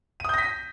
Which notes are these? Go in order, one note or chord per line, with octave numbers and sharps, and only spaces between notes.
D#6 G6 A#6 B6 D#7